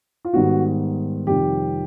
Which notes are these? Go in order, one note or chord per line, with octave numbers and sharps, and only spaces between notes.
F4
G#2 D#3 G3 B3 F#4
F2 C3 D#3 G3 G4